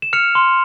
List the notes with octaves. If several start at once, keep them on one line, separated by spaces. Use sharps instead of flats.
E7
F6 C#7 F7
C6